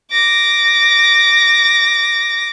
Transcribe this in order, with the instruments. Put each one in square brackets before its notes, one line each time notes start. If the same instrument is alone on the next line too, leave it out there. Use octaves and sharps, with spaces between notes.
[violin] D6 A#6